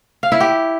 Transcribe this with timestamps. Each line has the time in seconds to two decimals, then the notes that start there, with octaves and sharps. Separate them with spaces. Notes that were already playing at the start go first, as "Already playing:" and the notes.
0.23 F5
0.32 E4
0.40 G4